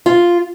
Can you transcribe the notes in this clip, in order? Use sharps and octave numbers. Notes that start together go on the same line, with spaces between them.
F4